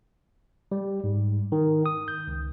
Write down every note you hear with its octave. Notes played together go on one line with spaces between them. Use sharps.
G3
G#2
D#3
D#6
G6
C#2